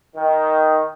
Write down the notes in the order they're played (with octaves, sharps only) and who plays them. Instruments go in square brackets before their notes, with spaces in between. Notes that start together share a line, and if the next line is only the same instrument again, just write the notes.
[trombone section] D#3